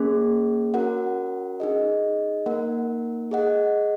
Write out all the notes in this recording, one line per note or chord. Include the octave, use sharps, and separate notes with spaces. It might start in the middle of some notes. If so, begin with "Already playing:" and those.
Already playing: A#3 C#4 G#4
C#4 F#4 A#4 F#5
D#4 G#4 D#5
A#3 D#4 A#4 F#5
G#4 D#5 F#5